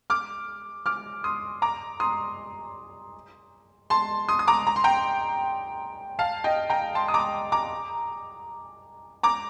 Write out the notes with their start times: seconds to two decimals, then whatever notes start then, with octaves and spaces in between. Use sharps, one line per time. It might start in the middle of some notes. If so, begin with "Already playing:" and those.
0.10 D6 F6
0.86 D6 F6
1.24 C6 D#6
1.62 A#5 D6
2.00 C6 D#6
3.90 A5 C6
4.28 C6 D#6
4.39 D#6
4.48 A#5 D6
4.67 A#5
4.76 C6
4.84 G5 A#5
6.19 F5 A5
6.44 D#5 G5
6.70 G5 A#5
6.95 A5 C6
7.08 D#6
7.14 A#5 D6
7.52 A#5 D6
9.23 A#5 D6